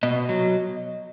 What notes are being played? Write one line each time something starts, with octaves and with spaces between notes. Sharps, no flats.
B2 D#5
F#3